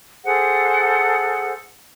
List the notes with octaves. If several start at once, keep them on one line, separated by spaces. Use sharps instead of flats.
G#4 A4 C5 F#5